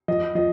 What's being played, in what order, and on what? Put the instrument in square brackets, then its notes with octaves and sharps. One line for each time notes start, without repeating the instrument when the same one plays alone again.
[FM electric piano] F3 [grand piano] D#5
[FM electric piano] F3 [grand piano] D#5